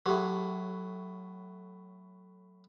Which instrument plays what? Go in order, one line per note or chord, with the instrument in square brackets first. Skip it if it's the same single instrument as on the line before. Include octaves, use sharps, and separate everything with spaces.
[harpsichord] A2 F#3 [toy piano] G4 G#4